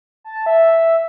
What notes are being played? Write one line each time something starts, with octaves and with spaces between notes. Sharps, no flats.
A5
E5